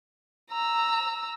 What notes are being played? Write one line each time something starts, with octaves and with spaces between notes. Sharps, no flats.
A#5 E6